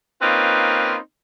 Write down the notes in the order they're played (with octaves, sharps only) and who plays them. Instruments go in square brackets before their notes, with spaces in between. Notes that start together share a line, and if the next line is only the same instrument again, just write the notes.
[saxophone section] A#3 C4 C#4 D#4 F4 B4